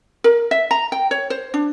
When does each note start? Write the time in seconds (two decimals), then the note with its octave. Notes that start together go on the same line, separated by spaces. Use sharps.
0.24 A#4
0.51 E5
0.71 A#5
0.92 G5
1.11 C#5
1.30 C5
1.54 D4